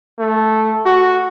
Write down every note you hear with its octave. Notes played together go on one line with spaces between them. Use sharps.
A3
F#4